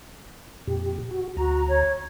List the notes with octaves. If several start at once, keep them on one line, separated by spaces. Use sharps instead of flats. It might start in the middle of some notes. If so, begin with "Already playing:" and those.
F2 A#2 G4
F#4
D2 F#4 A#5
C#5